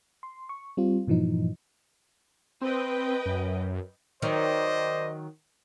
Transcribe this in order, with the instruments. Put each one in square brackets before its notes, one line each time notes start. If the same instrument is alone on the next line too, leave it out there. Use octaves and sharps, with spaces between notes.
[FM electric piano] C6
C#6
G3 C4 F4
G2 A#2 E3 F3 D#4
[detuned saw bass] C4 [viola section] B4 D#5 G5
[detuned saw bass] F#2
[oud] D#3 F#3 [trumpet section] C5 D5 D#5